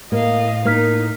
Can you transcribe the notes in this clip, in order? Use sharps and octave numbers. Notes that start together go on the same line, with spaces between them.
A2 A#3 D#5 F5
A#3 D#4 A#4 F6 B6